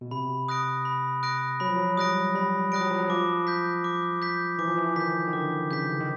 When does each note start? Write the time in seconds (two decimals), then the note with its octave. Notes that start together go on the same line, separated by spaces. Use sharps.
0.01 B2
0.11 C3 B5
0.48 D#6 F#6 A#6 D7
0.85 B5
1.23 D#6 F#6 A#6 D7
1.60 F#3 B5
1.68 F3
1.76 F#3
1.97 G3 D#6 F#6 A#6 D7
2.35 G3 B5
2.72 G3 D#6 F#6 A#6 D7
2.81 F#3
2.90 F3
2.98 F#3
3.09 F3 D6
3.47 G6 B6
3.84 D6
4.22 G6 B6
4.59 E3 D6
4.68 F3
4.77 E3
4.96 D#3 G6 B6
5.27 D#3
5.33 D3 D6
5.71 C#3 G6 B6
6.00 D#3